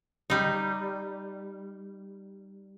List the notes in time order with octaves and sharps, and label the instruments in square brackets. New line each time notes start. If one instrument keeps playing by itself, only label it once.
[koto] G3 D#4